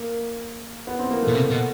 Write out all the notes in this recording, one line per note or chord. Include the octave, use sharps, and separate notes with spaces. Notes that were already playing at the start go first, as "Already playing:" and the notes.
Already playing: A#3
B3
C4
A#3
A3
B2
C3
B2